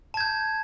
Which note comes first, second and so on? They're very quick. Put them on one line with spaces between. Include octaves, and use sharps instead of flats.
A5 G#6 G6